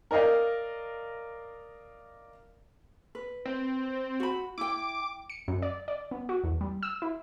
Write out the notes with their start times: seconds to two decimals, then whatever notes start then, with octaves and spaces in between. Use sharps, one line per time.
0.11 A#4 D5 D#5 F5
3.15 B4
3.45 C4
4.20 F#4 B5
4.58 E4 G5 D6
5.30 C#7
5.48 F#2
5.62 D5
5.88 D5
6.11 B3
6.29 F#4
6.44 E2
6.61 G3
6.83 E6
7.02 E4